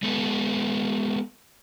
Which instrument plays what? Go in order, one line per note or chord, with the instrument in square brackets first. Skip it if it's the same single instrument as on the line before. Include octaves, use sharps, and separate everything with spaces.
[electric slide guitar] G#3 B3 A4 B4